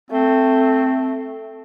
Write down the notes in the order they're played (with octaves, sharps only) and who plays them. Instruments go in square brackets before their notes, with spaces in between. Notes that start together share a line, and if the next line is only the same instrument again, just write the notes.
[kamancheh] A3 [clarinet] C4